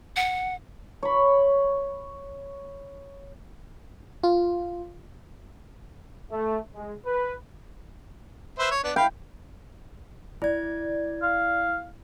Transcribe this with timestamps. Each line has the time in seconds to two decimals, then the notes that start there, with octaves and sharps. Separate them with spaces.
0.16 F#5
1.03 C#5 B5
4.23 F4
6.31 A3
6.74 G#3
7.05 B4
8.59 B4 C5 E5
8.71 C#5
8.84 B3 D4
8.96 F5 G5 B5
10.42 E4 D5 G#6
11.23 F5